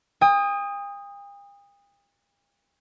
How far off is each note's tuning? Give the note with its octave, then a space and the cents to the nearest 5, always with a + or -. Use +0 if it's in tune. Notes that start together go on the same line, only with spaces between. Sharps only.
G5 +45 D#6 +0